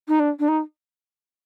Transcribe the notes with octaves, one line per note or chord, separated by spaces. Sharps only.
D#4
D4
D4
D#4